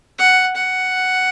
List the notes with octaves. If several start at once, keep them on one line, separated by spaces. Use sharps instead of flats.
F#5
F#5